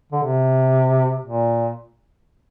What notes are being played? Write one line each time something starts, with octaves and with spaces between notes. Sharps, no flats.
D3
C3
A#2